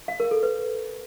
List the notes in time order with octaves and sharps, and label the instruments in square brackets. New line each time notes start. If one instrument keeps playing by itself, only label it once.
[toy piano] F5
A#4
A4
B4